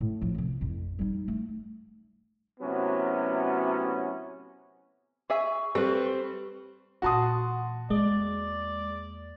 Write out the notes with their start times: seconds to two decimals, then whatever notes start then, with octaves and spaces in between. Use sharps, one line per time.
0.01 A2
0.21 D3 F3
0.35 C2 C3
0.61 A1 F2
0.99 G3 D#4
1.28 A3
2.60 A2 C3 F#3 B3 C#4 F#4
5.30 G#4 E5 G#5 C#6
5.75 G3 C4 A4 B4
7.02 A#2 E3 F#4 F#5 A5 C6 D#6
7.90 E2 G#3 A#3 D5